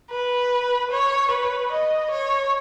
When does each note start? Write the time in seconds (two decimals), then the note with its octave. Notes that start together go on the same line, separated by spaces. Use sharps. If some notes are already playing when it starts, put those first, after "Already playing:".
0.11 B4
0.91 C#5
1.31 B4
1.71 D#5
2.11 C#5